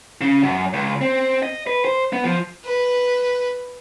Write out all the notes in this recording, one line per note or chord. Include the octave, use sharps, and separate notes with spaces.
C#3
F#2
C#2
C4
D#5
B4
C5
B3
F3
B4